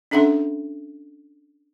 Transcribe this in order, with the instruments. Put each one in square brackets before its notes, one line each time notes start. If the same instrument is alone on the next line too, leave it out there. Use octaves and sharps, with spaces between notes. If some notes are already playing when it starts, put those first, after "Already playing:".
[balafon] C#4 D4 A4 E5 F#5 C6